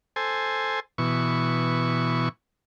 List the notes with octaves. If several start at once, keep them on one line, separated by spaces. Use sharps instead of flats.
A4 C5 G#5
B2 E3 C#6